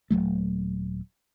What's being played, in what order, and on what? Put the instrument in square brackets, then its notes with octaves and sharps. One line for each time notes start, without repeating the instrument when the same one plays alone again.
[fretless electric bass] D#1 D#2 F#3 A3